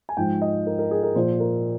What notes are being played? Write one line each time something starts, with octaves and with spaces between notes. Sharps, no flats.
G#5
G#2 F3 G5
D#5
A#4
A#4
G#4
A#4
A#2 F3 C5
A#4